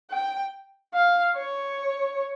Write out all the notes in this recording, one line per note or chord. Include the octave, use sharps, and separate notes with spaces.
G5
F5
C#5